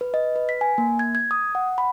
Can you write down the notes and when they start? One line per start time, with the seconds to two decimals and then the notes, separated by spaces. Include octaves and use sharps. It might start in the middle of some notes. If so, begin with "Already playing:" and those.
0.01 B4
0.14 D#5
0.36 B4
0.49 B6
0.61 G#5
0.78 A#3
0.99 G#6
1.15 G#6
1.31 D#6
1.55 F#5
1.78 B5